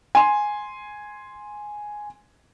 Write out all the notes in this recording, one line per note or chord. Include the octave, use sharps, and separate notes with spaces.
G#5 C6